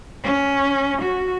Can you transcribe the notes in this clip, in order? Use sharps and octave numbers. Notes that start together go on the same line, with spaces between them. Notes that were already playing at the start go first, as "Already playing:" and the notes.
C#4
F#4